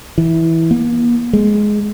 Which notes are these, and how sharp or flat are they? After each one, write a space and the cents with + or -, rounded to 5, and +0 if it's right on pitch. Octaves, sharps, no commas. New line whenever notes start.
E3 -10
A#3 +40
G#3 +10